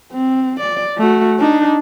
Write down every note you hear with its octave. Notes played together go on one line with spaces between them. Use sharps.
C4
D5
A3 F#4
D4 D#4